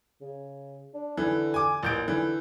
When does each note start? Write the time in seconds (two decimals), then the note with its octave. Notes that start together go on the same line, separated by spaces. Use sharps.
0.21 C#3
0.94 D4
1.17 D3 E3
1.54 G#5 D6
1.83 A1 A#2 G6 D7
2.08 D3 E3